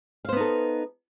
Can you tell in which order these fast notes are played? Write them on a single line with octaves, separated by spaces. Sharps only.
F5 C5 B3 D#4 A4